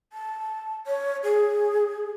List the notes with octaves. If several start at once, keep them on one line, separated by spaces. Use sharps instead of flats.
A5
C#5
G#4